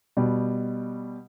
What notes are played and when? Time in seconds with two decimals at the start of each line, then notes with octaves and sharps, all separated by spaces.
0.17 B2 G3 G4